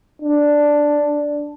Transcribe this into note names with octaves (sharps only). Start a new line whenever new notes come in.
D4